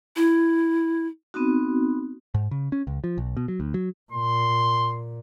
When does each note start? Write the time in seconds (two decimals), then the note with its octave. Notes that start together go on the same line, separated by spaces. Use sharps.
0.16 E4
1.34 B3 C4 D#4 F#4
2.34 G#2
2.51 C#3
2.72 C#4
2.87 C#2
3.04 F3
3.18 B1
3.37 B2
3.48 F#3
3.60 D2
3.74 F#3
4.12 A#2 C6